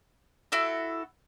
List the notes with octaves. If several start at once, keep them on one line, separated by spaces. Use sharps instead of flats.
E4 F#4 A4